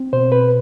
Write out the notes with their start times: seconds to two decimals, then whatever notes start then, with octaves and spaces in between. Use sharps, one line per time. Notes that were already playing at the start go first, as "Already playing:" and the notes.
Already playing: C4
0.13 B2 C5
0.32 B4